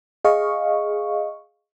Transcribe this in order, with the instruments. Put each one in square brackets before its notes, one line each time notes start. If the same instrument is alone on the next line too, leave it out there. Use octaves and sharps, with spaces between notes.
[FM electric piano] G#4 D#5 F5 C#6